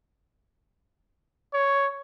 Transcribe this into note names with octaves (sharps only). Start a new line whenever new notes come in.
C#5